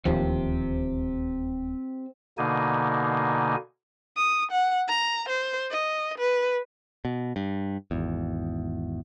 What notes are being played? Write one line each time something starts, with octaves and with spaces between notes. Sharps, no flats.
D1 D#2 F3 C4 G4
B2 D3 A#3 D#4 G#5
D#6
F#5
A#5
C5
D#5
B4
B2
G2
G#1 E2